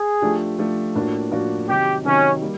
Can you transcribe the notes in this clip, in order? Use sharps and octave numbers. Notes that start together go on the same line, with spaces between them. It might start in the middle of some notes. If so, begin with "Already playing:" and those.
Already playing: G#4
F3 A3 D4 G4
F3 A3 D4 G4
A2 F3 A#3 D4 F#4
A2 F3 A#3 D4 F#4
C3 D#3 F#3 G4
C3 D#3 F#3 C#4
G3 A#3